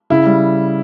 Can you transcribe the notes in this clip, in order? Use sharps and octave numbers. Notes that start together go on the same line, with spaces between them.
C#3 E4
G3